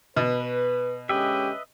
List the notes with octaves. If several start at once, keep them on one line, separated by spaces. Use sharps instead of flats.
B2 B4
D3 G#3 C#4 G4 B4 D#5 E5